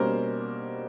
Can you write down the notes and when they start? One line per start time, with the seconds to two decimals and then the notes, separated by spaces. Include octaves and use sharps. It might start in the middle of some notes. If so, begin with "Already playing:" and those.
Already playing: B2 G3 A#3 C#4 A#4 C5